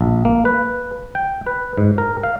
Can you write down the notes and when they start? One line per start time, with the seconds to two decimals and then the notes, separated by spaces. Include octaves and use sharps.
0.01 A#1
0.25 A#3
0.45 B4
1.15 G5
1.46 B4
1.77 G#2
1.98 A#4
2.23 F5